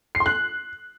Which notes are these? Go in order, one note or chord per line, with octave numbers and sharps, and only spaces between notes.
C7
C6
F#6